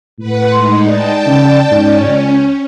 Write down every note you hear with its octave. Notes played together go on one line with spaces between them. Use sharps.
A2 B4 F#5
G#3 D#4 C6
D5 G5 A5
C#3
G#2 C#4
C#2